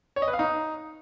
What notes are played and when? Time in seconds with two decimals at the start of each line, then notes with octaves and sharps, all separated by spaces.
0.16 C#5
0.22 D#5
0.28 B4
0.33 F5
0.39 D#4